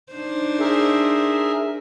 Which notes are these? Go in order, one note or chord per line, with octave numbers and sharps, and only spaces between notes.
D4 D#4 C5
G#4 A#4 E5